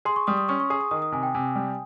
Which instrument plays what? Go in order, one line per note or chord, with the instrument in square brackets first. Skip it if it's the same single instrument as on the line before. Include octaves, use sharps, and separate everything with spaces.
[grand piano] G#4 [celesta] C6
[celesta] C#6
[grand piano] G3 [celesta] D#6
[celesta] D#6
[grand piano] C#4 [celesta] C#6
[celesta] C#6
[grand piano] G#4 [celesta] D#6
[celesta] D#6
[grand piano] D#3 [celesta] D#6
[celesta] D#6
[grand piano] C3 [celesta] G#5
[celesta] G5
[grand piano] C3 [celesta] G#5
[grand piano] G3